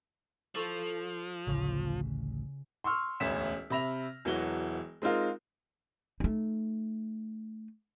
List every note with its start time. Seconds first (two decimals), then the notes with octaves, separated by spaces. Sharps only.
0.55 F3 F4 A4 C#6
1.47 A1 D2 C#3
2.84 C6 C#6 E6 F6
3.20 E1 A1 D2 C#4 B6 E7
3.70 C3 E5 B5 A#6 F7
4.25 E1 E3 F#3 F#4 G7
5.02 G#3 C4 D#4 F4 A#4
6.20 A3 D#4